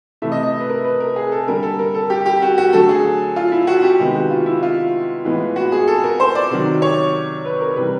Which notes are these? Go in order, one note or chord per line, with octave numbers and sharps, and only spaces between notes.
C3 E3 A3 E5
D#5
D#5
B4
A#4
B4
A#4
G#4
A4
D3 G3 A#3 A#4
A4
A#4
A4
G4
G4
F#4
F#4
D3 F#3 A3 A4
G#4
F4
E4
F#4
G4
C3 D#3 G#3 B3 G4
F#4
F4
E4
F4
A2 E3 G#3 B3
F#4
G#4
A4
A#4
C5
D5
C3 D#3 F#3
C#5
B4
A#4
C3 E3 G3 B4